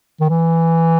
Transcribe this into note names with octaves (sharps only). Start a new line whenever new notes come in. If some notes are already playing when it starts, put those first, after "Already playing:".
D#3
E3